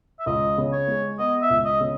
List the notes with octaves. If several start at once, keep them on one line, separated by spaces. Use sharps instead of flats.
E5
C#2 D#5
C#3
C#5
G#3
B3 D#5
E5
C#2
D#5
C#3